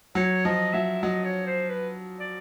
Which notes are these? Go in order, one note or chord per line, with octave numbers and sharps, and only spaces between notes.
F#3 C#5
F3 D#5
F#3 E5
F#3 D#5
C#5
C5
B4
D5